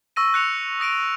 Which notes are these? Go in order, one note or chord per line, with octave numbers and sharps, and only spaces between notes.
C#6 E6 A#6 D#7
F#6 C#7 F7
D#6 A#6 D7 D#7 F7